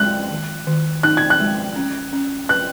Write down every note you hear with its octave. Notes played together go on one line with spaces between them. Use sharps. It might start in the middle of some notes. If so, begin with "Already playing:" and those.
Already playing: G#3 F#6
D#3
D#3
D#4 F#6
G#6
F#6
G#3
C#4
C#4
B4 F#6